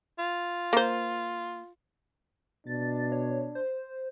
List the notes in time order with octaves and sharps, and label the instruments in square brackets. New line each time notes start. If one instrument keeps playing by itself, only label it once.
[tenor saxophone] F4
[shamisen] A#3 C5
[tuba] B2 [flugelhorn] D4 [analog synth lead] A6
[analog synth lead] C#5
C5